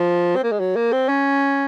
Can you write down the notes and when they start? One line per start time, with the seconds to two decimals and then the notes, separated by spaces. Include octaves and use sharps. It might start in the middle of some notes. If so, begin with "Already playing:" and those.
Already playing: F3
0.36 C4
0.44 A#3
0.52 G#3
0.60 F#3
0.76 A#3
0.92 C4
1.09 C#4